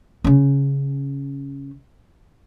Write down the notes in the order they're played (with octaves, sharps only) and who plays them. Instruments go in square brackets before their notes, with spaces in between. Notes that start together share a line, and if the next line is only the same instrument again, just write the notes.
[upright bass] C#3 C#4